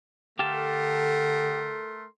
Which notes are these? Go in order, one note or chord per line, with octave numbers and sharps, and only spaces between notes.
D3 A3 G4 A4 A#4 F5 A5 C6